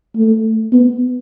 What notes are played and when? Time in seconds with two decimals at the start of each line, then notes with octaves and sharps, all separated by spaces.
0.17 A3
0.72 B3